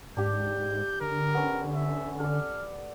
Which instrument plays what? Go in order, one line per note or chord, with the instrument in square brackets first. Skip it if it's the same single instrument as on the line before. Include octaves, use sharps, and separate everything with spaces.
[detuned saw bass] G#2 [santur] D4 G4 [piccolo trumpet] G6
[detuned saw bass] D3 [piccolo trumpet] A#4
[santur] B3 C#4
[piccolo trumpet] E5
[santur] A4 D5 [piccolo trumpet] F6